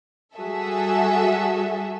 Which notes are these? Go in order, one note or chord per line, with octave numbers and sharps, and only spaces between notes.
G3 F#4 G#4 A4 E5